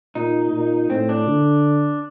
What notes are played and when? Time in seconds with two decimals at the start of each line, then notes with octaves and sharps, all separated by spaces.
0.15 A#2 D#4
0.53 A#2
0.90 A2 C4
1.09 D4
1.27 D3